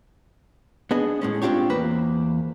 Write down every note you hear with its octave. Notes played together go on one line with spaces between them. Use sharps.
B3 D4 G#4 D#5
A2 G#3 C#4
C4 D4 F4 G4 C#5
E2 A#3 B4 C5